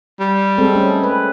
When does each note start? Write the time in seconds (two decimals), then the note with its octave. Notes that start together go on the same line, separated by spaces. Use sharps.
0.20 G3
0.58 G#3 C4 A4
0.75 A3 C#4
1.04 B4